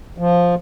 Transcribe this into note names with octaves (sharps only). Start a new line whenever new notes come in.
F3